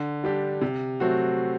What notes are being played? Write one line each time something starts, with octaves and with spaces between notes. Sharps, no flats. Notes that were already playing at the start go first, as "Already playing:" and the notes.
Already playing: D3
G3 D4 G4
C3
F#3 A3 C4 F#4